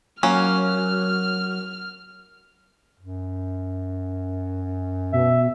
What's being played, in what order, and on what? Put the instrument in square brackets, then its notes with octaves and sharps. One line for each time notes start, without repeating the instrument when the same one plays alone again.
[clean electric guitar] F#3 [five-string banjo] A#3 C#4 [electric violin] F6
[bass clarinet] F#2
[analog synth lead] B2 [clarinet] E5